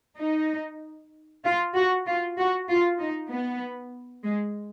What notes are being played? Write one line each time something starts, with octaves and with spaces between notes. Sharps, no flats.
D#4
F4
F#4
F4
F#4
F4
D#4
B3
G#3